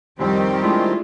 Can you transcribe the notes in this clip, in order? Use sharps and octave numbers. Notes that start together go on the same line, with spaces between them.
C2 F2 D#3 G3 C4 G4
G#3 A3 D4 E4 F4